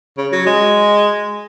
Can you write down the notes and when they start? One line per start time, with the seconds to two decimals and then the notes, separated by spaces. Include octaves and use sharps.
0.17 C#3
0.32 F#3
0.46 G#3